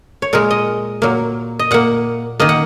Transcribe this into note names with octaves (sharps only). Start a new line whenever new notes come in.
C#5
A#2 G#3 A#4
D#5
A#2 F#3 A#3
D#5
A#2 A#3 F#5
D#3 A#3 D#5
F#5